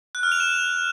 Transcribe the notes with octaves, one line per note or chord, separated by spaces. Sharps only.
F#6
F6
F7
E7